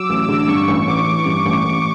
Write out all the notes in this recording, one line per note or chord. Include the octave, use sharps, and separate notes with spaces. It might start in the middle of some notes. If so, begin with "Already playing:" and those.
Already playing: F#3 D6 E6
A1
D3
G2 C#6
A1
A1 D6
E3
G2
A1
A1